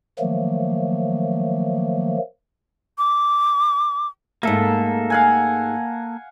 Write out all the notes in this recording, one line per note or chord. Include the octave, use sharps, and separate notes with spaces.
D#3 F3 F#3 A3 A#3
D6
G#2 A3 A#3 A4
F5 F#5 G#5